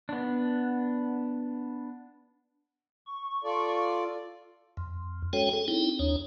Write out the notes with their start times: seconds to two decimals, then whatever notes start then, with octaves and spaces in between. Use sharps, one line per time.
0.09 B3 D4
3.06 C#6
3.44 F4 A4 D5
4.77 F2
5.33 G#3 C#4 F#4 A4 C#5 G5
5.53 G#4 A4
5.68 C4 D#4 E4 G5
5.99 D#2 D4 C#5